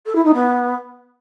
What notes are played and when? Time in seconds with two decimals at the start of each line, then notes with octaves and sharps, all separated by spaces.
0.06 A4
0.15 E4
0.24 D#4
0.34 B3